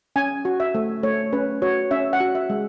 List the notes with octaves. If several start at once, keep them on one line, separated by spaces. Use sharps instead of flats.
C#4 G#5
F#4
E5
A3
A3 C#5
C#4 B4
F#4 C#5
C#4 E5
F#5
F#4
E5
G#3